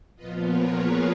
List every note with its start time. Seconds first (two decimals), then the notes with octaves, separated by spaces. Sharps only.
0.16 A#2 F3 B3 F4 B4 D#5
0.45 A#4 C#5
0.73 G#4 B4